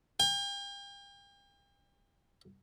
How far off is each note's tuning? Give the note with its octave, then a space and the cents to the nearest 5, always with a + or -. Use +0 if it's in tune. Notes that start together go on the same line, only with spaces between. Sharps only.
G5 +40